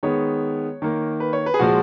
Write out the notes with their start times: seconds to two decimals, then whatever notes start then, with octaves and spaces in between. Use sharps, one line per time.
0.03 D#3 G#3 B3 C#5
0.82 D#3 A#3
1.20 B4
1.33 C#5
1.46 B4
1.54 G#4
1.59 A#2 F3 G#3 F#4